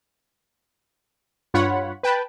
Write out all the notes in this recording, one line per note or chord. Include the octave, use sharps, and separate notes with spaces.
G2 F4 C#5 F#5 B5
B4 G5 A5 B5